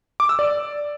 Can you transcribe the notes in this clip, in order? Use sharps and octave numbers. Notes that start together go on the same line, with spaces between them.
D6
E6
D5